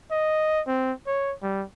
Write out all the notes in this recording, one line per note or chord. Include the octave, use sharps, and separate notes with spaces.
D#5
C4
C#5
G3